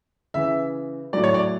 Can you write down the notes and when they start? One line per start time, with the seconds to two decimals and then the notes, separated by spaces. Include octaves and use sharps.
0.34 C#3 E3 E5
1.13 A2 F#3 D5
1.24 C#5
1.34 D5